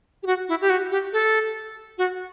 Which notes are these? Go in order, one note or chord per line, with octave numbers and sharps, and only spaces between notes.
G4
F#4
E4
G4
F#4
G4
A4
F#4